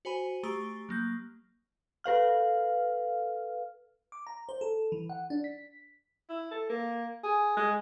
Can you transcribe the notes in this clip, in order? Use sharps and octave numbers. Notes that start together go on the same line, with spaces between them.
F#4 C5 G#5 B5 D#7
A3 G4 A#5 C#6 D#6 D7
F#3 A#3 G6
A4 B4 F5 F6
D6
A#5
C5
A4
E3
F#5
D4
B6
E4
A4
A#3
G#4
G#3